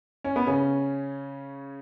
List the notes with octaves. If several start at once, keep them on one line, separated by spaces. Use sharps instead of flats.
C#4
B3
C#3 C#4